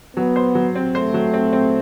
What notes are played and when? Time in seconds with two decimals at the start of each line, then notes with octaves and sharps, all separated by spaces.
0.16 F#3 B3
0.36 C5
0.55 F#3
0.75 C4
0.95 A3 C5
1.14 F#3
1.34 C4
1.53 C4